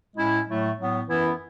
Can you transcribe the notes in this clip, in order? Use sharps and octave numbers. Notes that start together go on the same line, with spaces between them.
A2 G#3 C#4 E4
A2 F#3 A3 E4
A2 F#3 B3
F#2 E3 B3 E4